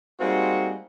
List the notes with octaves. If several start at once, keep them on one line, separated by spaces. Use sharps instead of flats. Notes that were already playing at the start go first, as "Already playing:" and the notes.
G3 G#3 A#3 C4 D#4 F#4